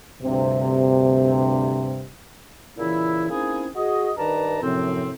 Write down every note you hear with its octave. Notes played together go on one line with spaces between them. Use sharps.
D2 G2 C3
A#2 C#3 E3 E4
A#3 C4 C#4 D#4 E4 G#4
F#4 G#4 D#5
G2 D#3 B4 D5 A5 A#5
F#2 A2 C3 F3 C4